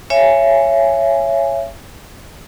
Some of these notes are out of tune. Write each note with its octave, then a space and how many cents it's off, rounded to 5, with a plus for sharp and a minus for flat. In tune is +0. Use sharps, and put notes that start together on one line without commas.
C#5 +0 E5 +30 G#5 +0